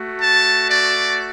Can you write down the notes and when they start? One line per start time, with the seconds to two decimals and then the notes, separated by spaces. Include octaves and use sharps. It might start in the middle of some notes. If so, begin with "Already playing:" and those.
Already playing: A3 F#4
0.20 A5
0.68 D5